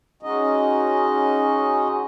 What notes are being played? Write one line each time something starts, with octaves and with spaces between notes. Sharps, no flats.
G#3 C#4 D#4 F#4 D#5